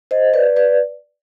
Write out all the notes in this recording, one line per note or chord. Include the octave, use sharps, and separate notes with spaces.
C5 D#5
B4 D5
B4 D5